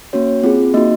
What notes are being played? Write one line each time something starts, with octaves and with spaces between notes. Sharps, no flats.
A#3 C#4 F#4 C#5
C4 F4 G#4
A#3 D#4 F#4 D#5